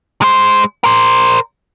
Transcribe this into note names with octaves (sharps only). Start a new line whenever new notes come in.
G#3 C5
A#4 C5